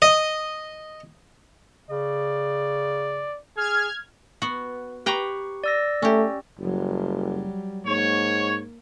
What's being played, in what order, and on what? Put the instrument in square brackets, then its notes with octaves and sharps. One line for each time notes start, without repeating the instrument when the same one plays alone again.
[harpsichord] D#5
[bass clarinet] C#3 [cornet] D5
[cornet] G#4 [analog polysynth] F6 G#6
[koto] B3 F#4
[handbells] G4 C#6 [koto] B4 G5 A#5
[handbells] D5 E6 A#6
[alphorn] A3 [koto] C#4 G4
[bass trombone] F#1 [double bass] F#3 G3
[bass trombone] G#2 [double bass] A#3 [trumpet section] C#5